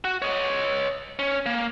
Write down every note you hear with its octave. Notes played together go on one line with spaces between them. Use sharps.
F#4
C#5 D#5
C#4
A#3